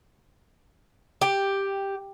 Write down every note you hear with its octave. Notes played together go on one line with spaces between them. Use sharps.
G4